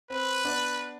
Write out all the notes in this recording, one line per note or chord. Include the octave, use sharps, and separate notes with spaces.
C4 B4
B3 D4